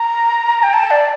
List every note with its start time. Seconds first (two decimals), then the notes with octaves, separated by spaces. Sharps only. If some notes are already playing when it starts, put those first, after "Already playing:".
Already playing: A#5
0.63 G5
0.73 A5
0.91 D5